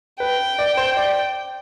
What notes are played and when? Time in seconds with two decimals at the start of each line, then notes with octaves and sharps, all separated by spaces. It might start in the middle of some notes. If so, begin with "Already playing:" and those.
0.20 B4 G5
0.59 D5
0.77 C5
0.97 D5